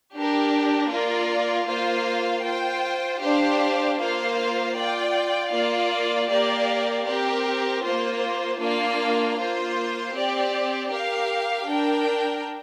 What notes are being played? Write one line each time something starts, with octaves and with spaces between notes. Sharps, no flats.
D4 G4 A#4
A#3 F4 A#4 D5
A#3 F4 C5 F5
F4 C5 G5
D4 G4 C5 F5
A#3 F4 C5 F5
F4 D5 G5
A#3 F4 D5 F5
A#3 G4 A#4 D5 F5
C4 G4 A#4
A#3 F4 C5
A#3 D4 F4 D5 F5
A#3 F4 C5
C4 G4 D5
G4 A#4 F5
D4 A#4 G5